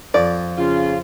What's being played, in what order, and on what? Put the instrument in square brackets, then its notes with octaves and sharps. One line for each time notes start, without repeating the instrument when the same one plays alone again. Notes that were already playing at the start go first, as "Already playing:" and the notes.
[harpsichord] F2 [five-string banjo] D5
[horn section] C#3 F4